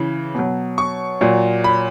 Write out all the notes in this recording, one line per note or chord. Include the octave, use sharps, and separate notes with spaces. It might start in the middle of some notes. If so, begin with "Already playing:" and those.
Already playing: C#3 E3
B2 F#3
C#6
A#2 F#3
B5